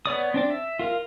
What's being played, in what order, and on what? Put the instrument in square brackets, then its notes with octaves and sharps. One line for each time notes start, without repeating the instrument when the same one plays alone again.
[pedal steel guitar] B3 C#5 D5 D#6
C4 D4 D5
E5
F4 A#4 F5